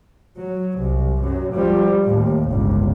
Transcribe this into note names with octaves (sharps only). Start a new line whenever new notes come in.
F#3
C2
F#2 F#3
F3 G3
D#2 A2
G1 C#2